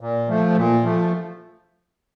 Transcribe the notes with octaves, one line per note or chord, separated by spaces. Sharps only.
A#2
F3 A3
A#2
F3 A3